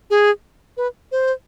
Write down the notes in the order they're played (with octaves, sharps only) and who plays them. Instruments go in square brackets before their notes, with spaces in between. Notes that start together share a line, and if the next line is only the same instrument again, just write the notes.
[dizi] G#4
B4
C5